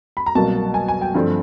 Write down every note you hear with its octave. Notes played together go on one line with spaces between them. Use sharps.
B5
A#5
C2 B2 F#3 A#3 A5
G#5
G#5
G5
G2 D3 F3 A3 C4